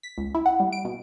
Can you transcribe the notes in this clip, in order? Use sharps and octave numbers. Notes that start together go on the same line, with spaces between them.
B6
C#2
E4
F#5
G3
D7
B2